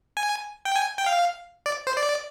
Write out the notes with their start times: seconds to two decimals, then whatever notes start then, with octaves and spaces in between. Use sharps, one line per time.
0.17 G#5
0.65 G5
0.76 G#5
0.98 G5
1.06 F5
1.66 D5
1.87 C5
1.96 D5